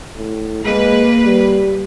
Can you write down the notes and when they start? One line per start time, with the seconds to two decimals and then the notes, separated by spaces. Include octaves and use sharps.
0.16 A2
0.65 G#3 A#3 B4
1.25 G3